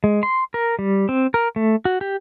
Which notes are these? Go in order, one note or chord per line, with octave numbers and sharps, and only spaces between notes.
G#3
C6
A#4
G3
C4
A#4
A3
F#4
G4